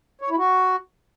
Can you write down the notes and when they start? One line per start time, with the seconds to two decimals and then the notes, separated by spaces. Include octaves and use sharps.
0.21 C#5
0.30 E4
0.38 F#4